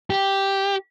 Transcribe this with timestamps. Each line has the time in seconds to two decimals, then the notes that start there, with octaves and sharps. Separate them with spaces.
0.10 G4